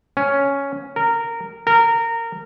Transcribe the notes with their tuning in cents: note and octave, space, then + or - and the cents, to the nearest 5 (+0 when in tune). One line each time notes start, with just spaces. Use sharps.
C#4 +5
A#4 -15
A#4 -20